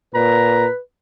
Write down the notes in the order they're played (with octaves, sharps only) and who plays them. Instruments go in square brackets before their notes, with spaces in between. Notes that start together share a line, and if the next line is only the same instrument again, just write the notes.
[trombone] A#2 [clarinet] B4 [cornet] A#5